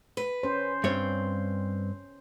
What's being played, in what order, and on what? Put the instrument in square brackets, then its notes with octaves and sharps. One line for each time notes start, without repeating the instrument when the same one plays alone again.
[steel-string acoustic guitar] B4
[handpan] C#4 C5
[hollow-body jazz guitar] G2 C#5 [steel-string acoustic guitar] C4